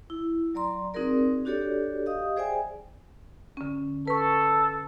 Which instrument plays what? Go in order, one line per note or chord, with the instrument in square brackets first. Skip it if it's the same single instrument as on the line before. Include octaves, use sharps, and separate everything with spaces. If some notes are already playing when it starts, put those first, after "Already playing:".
[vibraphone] E4
F#3 D5 A#5 C6
C4 D#4 F#4 G#4 A#4 D5
D4 F#4 G4 A4 C#5 D5
G4 D#5 F5 D#6
G#4 C5 D5 E5 G5 G#5
[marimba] D3 C#4
[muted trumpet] A4 [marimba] B4 C#6